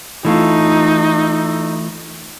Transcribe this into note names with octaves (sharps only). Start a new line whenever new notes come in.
E3 A3 D#4 F4